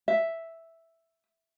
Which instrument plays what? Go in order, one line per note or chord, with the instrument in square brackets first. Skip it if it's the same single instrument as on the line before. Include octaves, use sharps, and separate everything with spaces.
[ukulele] E5